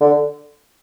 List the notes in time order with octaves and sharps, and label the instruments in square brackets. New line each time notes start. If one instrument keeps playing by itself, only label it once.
[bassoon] D3